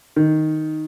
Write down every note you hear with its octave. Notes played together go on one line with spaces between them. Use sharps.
D#3